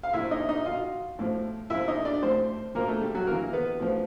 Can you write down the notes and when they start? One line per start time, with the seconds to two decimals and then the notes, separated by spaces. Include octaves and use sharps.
0.03 F5
0.13 A#2 F3 E4 E5
0.31 D#4 D#5
0.49 D#4 D#5
0.65 B2 F4 F5
1.19 A2 F3
1.70 A#2 F3 E4 E5
1.88 D#4 D#5
2.05 D4 D5
2.23 A2 F3 C4 C5
2.75 A#2 F3 A#3 A#4
2.88 A3 A4
3.01 G3 G4
3.15 F#3 F#4
3.27 C3 E3 A#3 A#4
3.53 B3 B4
3.80 A2 F3